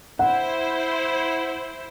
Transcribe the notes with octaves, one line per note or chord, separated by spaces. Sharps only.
E4 C5 F#5